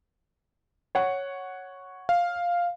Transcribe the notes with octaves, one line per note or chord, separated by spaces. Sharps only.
C#5 F#5
F5